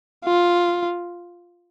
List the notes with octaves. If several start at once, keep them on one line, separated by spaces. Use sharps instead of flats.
F4